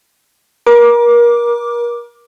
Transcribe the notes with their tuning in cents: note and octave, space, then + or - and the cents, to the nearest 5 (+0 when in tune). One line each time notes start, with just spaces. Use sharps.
A#4 +35 D6 +0